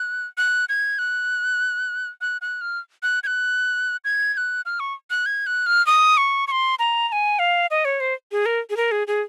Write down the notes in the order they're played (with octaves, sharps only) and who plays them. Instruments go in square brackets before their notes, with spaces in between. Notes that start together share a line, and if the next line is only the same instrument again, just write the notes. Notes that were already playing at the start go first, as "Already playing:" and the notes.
Already playing: [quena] F#6
F#6
G#6
F#6
F#6
F#6
F6
F#6
G#6
F#6
G#6
G#6
F#6
F6
C#6
F#6
G#6
F#6
F6
D#6
C#6
C#6
C6
A#5
A#5
G#5
F5
D#5
C#5
C5
G#4
A#4
G#4
A#4
G#4
G#4